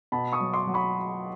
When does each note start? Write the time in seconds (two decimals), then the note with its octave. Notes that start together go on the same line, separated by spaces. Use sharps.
0.12 B2 A5 B5
0.32 C#6 D#6
0.40 F#3
0.53 C6 D6
0.67 F#3
0.74 B5 C#6